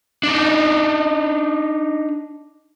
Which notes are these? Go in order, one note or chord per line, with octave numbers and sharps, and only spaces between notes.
D4 D#4